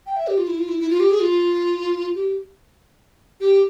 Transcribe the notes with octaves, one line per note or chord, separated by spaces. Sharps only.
G5
E5
G4
F4
E4
F4
E4
E4
F4
G4
G#4
F4
G4
G4